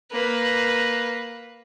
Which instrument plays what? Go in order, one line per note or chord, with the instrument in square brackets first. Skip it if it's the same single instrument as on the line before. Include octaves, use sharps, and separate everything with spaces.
[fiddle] A#3 B4